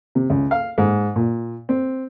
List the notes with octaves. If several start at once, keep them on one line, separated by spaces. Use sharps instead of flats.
C3
C#2
F5
G#2
A#2
C4